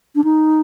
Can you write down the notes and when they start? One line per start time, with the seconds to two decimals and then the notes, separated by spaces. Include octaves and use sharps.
0.15 D4
0.24 D#4